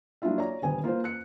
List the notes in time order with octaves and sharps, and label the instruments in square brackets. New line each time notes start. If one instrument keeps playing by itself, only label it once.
[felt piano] F#3 A#3 D4 E4 F4 E5
C#5 D5 A#5
D#1 D2 B3 G#5
A#3 F4 B4 C5
F#6 C#7